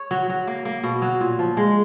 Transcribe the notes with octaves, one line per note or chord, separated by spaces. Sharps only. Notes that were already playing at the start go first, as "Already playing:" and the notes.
Already playing: C#5
F#3
F#3
A#3
A#3
B2
F#3
A#2
F3
G#3